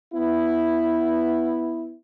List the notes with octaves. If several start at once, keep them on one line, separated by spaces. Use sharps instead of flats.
B3 E4